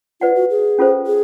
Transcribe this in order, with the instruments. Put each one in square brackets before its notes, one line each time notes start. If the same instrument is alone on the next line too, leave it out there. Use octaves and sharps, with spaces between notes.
[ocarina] F4 [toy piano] B4 D5 F#5
[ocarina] F#4
G#4
[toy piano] C#4 F4 A4 C5
[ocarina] G#4